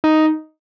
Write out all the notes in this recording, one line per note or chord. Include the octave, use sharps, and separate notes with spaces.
D#4